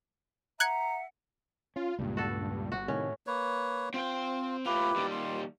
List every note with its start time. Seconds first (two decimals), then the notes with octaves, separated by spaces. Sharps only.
0.60 E5 F#5 A#5 F#6 G#6 C#7
1.76 C#4 F4
1.99 C#2 G2 A#2
2.17 F#4 A4
2.72 G1 F#4
2.88 A2 C3 D#3 C#4
3.27 A#3 B4 C#5
3.94 C4 F4 G5
4.66 A2 E4 F4 G4 B4
4.96 D#2 G3
5.11 C6